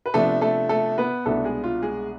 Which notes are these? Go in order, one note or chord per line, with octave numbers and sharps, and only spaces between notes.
B4
C3 F3 A3 B3 D4 A4
A3 A4
A3 A4
B3 B4
C2 B2 A3 B3 D4 A4
G#3 G#4
F4
G#3 G#4